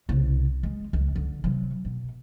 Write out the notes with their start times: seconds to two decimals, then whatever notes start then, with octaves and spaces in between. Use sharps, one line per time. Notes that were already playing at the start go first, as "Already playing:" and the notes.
0.09 C2 C#3
0.63 G#3
0.93 C#2
1.15 D3
1.44 C3 F#3
1.85 B2